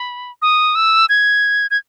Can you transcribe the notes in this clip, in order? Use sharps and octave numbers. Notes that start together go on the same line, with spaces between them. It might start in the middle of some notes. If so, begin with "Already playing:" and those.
Already playing: B5
D#6
E6
G#6
G#6